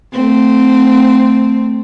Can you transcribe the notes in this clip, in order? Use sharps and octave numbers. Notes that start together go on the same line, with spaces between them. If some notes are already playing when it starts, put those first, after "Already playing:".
A3 C4